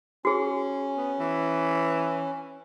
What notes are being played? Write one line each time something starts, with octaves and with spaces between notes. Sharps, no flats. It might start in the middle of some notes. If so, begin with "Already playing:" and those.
C#4 F#4 G#4
B3
E3